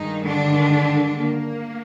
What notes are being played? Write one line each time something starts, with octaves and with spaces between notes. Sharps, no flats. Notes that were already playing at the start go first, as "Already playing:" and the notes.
Already playing: G2 D#3 G#3 D#4
D3 D4
A#3